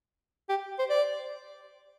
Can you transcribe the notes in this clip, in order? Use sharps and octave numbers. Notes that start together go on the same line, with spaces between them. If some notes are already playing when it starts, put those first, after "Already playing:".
G4
C5
D5